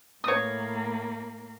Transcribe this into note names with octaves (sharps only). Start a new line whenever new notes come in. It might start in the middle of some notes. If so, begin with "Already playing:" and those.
A2 A#3 C#5 D#6